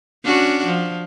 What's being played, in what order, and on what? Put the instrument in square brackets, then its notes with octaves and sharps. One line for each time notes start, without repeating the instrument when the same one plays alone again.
[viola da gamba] C#4 D4 F#4
F3